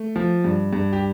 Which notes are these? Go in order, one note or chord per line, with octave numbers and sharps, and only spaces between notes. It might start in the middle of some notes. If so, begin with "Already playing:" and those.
Already playing: A3
F3
G2
G2
G4